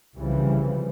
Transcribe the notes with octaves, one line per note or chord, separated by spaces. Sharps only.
C2 C#3 E3 F3 G3